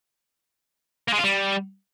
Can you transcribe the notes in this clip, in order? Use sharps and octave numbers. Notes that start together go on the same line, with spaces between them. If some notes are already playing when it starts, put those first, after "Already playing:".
A#3
G#3
F4
G3